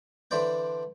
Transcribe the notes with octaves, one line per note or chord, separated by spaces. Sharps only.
D3 E3 C5 D5 G5